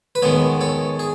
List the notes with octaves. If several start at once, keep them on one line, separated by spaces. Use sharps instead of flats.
B4
D#3 G#3 B3 A4 C#5
A4 C#5
G#4